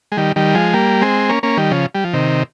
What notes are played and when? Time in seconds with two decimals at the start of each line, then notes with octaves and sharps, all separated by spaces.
0.12 G#3
0.17 D#3 G3
0.36 D#3 G3
0.55 F3 G#3
0.74 G3 A#3
1.02 G#3 C4
1.29 A#3 C#4
1.43 A#3 C#4
1.57 D#3 G3
1.71 C#3 F3
1.95 G3
2.04 F3
2.13 C3 D#3